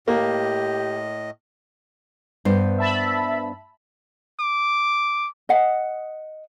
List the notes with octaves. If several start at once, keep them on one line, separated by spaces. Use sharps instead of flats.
A2 A#3 G4 D#5
G2 B3 C5
E5 A5 B5
D6
D#5 F#5